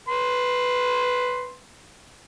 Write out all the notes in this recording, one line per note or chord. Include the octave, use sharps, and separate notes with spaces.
B4 C6